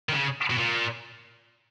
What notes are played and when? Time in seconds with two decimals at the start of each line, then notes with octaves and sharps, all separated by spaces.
0.09 D#3
0.12 C#3
0.50 B2
0.58 A#2